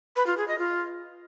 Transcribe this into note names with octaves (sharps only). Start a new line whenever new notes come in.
B4
F4
G#4
D#5
F4